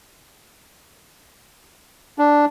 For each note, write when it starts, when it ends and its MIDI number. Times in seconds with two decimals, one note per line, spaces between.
2.19 2.45 62